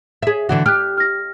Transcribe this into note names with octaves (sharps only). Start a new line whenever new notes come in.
G#4 E5
D3 E3 F#4
G4 F6 F#6
F6 A#6